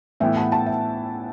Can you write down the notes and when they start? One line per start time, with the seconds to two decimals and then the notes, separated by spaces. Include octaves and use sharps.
0.20 A2 E3 B3 E4 E5 G5
0.37 F#5 A5
0.52 F#5 A5
0.66 E5 G5